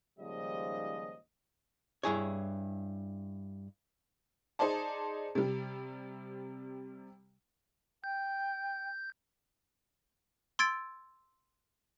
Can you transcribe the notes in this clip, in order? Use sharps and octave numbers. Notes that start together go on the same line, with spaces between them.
D#2 G#2 C#3 F3 G3 D#5
G2 E4 G#4 C#5
D#4 G#4 C5 D5 A5
C3 G3
G5 G6
C6 E6 G#6 A6 D7